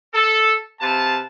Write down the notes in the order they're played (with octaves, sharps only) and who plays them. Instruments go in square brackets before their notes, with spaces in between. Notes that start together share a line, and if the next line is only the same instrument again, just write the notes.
[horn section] A4
C3 B4 F5 A5